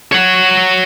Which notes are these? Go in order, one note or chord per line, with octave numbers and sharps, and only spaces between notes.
C#5 F#5